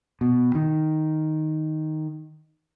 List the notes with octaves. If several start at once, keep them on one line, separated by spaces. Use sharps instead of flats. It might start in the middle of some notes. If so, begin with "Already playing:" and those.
B2
D#3